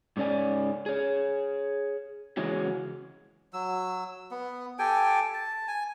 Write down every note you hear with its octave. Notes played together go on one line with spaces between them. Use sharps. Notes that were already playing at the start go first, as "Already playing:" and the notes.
G#2 C#3 C#4 D5 G#5
G#4 C#5
C#3 E3 G#3 C#4 F#4
F#3 E6
B3
G4 A4 G5 G#5
A5
G#5